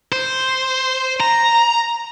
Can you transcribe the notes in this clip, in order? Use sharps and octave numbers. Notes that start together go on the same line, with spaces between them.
C5
A#5